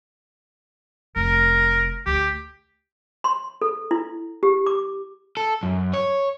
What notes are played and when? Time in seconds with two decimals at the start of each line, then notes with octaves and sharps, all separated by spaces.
1.16 F1 A#4
2.06 D2 G4
3.24 C6
3.61 A4
3.91 E4
4.43 G4
4.66 D6
5.37 A4
5.63 F#2
5.93 C#5